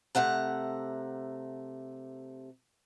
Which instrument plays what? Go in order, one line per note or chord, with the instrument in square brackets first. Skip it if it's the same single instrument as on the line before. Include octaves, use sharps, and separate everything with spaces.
[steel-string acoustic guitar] C3 A3 F#5 A#5